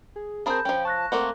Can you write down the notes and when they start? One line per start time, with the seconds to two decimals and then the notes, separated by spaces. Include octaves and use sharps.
0.16 G#4
0.46 C4 G#4 A#4 A5 B5 G6
0.65 F3 C#4 G5
0.85 A5 C#6 F#6 A#6
1.12 A3 A#3 C4 F#5